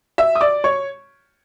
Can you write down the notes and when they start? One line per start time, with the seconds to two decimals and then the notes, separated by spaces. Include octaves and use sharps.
0.18 E5 E6
0.35 D#6
0.41 D5 D6
0.64 C#5 C#6